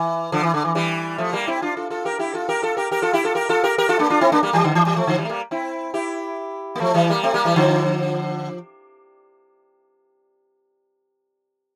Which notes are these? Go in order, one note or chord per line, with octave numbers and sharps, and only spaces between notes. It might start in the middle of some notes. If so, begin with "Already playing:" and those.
Already playing: E3
D3 F3
E3
D3
E3
E3 G3
F3 A3
G3 A#3
C4 E4
D4 F4
F4 A4
F4 A4
G4 A#4
E4 G4
F4 A4
G4 A#4
F4 A4
G4 A#4
G4 A#4
F4 A4
E4 G4
F4 A4
G4 A#4
F4 A4
G4 A#4
G4 A#4
F4 A4
A#3 D4
D4 F4
C4 E4
A#3 D4
G3 A#3
E3 G3
D3
E3
E3 G3
F3 A3
D3 F3
E3 G3
A3
G3 A#3
C4 E4
E4 G4
A#3
F3 A3
E3 G3
G3 A#3
A3 C4
G3 A#3
E3 G3
D3 F3